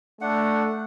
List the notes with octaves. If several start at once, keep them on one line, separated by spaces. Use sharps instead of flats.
A3 D4 F#5